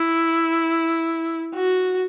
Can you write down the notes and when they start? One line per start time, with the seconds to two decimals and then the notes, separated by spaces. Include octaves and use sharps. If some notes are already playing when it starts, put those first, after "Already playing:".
Already playing: E4
1.55 F#4